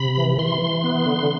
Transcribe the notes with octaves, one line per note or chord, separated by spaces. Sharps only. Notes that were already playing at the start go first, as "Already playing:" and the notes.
Already playing: C3 B5
E3
E3 C6
E3
B3
D3